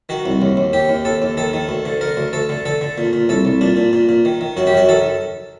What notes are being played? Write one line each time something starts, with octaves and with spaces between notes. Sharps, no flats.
D#3 F#4
C2
D#2
D#2
D#2 G4
D#2
D#2 A4
D#2
D#3 A4
D#3
D2
D3
D3 A#4
D2
D2 A4
D3
D3 A4
D3
A#2
A#2
C2 A4
C2
A#2 D4
A#2
A#2
A#2
D#3
D#3
F#2 F#4
G4
F#2 F#4
D#3 A4